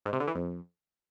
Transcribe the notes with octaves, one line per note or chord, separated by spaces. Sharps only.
G#2
C3
D3
E3
F2